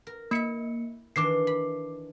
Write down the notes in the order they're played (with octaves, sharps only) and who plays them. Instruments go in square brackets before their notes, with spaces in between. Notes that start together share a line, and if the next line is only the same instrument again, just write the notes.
[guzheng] A#4
[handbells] A#3 C#7 [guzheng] E4 E5
[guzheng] D#3 E3 D4 [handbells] D6 C7
[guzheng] B5